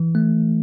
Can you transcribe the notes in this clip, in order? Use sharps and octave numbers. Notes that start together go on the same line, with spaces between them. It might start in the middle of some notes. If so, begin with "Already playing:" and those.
Already playing: E3
A3